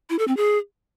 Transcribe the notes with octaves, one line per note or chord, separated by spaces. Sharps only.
E4
A4
C4
G#4